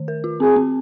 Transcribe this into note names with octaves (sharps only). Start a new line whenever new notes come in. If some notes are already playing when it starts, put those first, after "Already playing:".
Already playing: D#3
A#4
F4
C4 G#4
C4